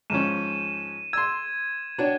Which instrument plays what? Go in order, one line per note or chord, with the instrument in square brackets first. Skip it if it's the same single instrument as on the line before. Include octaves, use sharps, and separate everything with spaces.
[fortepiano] G#2 F3 C#4 [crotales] D#7 E7
[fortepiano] C6 E6 [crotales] G#6
[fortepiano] D4 [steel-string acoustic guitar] F#4 C#5 G5